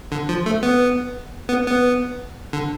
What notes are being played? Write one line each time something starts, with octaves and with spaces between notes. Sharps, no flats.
D3
F3
A3
B3
B3
B3
D3